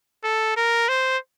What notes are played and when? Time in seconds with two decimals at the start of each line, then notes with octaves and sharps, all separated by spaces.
0.24 A4
0.57 A#4
0.89 C5